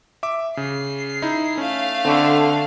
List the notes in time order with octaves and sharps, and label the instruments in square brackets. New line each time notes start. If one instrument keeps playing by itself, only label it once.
[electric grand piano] E5 D6
[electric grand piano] C#3 [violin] C7
[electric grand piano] D#4 E4
[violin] A3 F5 [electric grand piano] C#4
[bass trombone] D3 [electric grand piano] C4 C#6